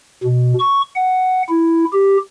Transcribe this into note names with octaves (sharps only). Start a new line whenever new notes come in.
B2
C#6
F#5
E4
G4